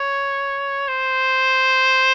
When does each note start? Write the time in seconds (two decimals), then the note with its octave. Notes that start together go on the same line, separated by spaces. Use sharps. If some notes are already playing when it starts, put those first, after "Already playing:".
Already playing: C#5
0.88 C5